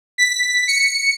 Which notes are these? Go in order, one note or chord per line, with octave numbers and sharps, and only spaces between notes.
B6
C#7